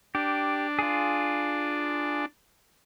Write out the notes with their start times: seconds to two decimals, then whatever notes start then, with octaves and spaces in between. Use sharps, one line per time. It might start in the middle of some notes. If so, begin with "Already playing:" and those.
0.15 D4 G4
0.79 F4 G#4